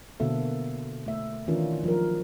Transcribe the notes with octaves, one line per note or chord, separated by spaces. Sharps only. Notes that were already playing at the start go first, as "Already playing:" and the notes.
B2 D3 A#3 A4 E5
A3 E5
D#3 E3 C#4 D4 F4 A#4
F3 F#3 A#4